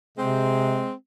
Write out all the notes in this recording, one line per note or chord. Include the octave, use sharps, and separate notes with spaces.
C3 G#3 C4